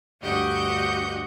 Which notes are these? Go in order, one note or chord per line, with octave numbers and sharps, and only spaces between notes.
D2 G2 F#4 G4 D#5 G6